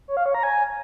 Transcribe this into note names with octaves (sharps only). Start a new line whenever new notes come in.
C#5
F5
C#5
A#5
G#5